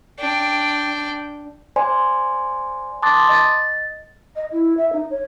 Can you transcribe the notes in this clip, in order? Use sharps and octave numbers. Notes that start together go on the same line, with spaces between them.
D4 G5
C5 D5 G#5 C6
A5 C6 D6 D#6 F#6 A6
D#5 A6
D#5
E4
E5
D#4
C#5